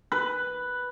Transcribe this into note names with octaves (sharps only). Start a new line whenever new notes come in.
B4